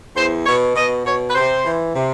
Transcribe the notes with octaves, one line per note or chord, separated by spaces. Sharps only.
E2 C5
B2 C#5
B2 D#5
B2 C#5
B4
C3 C5
E3
C3